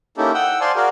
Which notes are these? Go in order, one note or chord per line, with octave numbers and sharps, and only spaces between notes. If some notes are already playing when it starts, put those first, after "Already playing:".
A#3 C#4 D#4 E4 G4 A4
F#5 G5 D#6 E6
C5 D5 F5 G#5 A5 C6
F#4 G#4 A#4 D5 F5